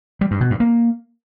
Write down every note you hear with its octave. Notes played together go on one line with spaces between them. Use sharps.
G3
G2
B2
G2
A#3